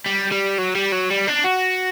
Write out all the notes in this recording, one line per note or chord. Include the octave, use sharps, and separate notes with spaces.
G3
G3
F#3
G3
F#3
G3
D4
F#4